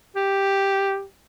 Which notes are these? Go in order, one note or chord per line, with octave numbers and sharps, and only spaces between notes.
G4